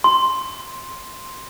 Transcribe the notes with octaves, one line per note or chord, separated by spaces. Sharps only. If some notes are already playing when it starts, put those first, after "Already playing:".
C6